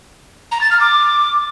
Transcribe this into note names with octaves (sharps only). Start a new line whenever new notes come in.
A#5
A6
F6
D6